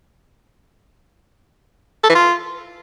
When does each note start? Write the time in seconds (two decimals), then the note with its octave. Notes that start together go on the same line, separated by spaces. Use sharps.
2.04 A4
2.09 E3
2.15 F4